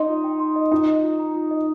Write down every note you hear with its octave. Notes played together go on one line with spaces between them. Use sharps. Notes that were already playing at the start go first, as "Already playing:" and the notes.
Already playing: D#4 D#5 C6
F4
G5
C6
D#5
D#4 F4
D#5
F4
A#5
F4
D#5